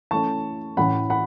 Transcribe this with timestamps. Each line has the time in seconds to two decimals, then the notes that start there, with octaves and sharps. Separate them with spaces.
0.11 E3 A3 C#4 A5 C#6
0.77 A2 E3 A3 C#4 F#5 B5
1.10 F#5 B5